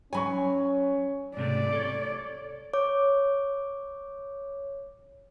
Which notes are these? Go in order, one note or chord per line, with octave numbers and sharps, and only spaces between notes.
F#3 C#4 C#5 G#5 B5 C#6
G#2 C3 A3 D5
A4 C#5
C#5 D6